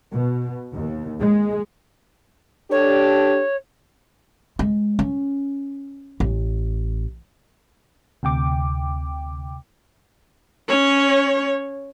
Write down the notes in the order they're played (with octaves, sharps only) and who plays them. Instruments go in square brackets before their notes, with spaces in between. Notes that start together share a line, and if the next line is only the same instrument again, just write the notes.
[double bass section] B2
D#2
G#3
[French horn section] D4 G4 A4 [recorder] C#5
[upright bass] G#3
C#4
A1
[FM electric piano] D2 C3 G5 D6
[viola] C#4 C#5